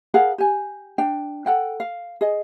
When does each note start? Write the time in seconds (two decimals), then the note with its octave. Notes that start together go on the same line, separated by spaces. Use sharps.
0.14 G#4 A#4 F5 F#5
0.38 G4 G#5
0.98 D4 G5
1.46 A4 F#5 G5
1.80 F5
2.21 G#4 D#5